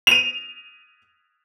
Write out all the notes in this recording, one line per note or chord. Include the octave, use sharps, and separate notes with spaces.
D#7 F7